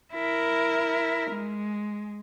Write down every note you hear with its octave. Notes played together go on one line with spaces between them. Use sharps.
E4 A#4
G#3